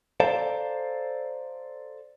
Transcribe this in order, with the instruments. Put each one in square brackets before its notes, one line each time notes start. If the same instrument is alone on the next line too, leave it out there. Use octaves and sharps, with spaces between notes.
[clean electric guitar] A4 C5 D5 F5 A5 A#5